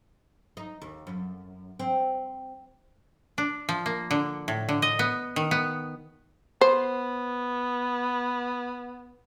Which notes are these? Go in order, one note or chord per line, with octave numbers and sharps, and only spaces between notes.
D#4
D#2
F#2
C4
D4
F3
A#3
D3
A2
D3
D#5
B3
D#3
B3
B3 C5